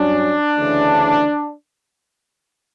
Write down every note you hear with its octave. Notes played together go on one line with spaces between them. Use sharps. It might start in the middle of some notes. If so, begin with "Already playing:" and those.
Already playing: G2 F#3 C#4 D4
D2 C#3 E3